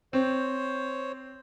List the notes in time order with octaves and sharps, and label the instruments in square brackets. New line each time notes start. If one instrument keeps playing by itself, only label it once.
[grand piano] C4 [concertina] C5 C#5